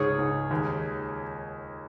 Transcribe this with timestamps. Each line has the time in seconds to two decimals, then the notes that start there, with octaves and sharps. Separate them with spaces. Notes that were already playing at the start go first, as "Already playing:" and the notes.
Already playing: C#2 G#2 G#4 C#5
0.19 G#2
0.51 D#2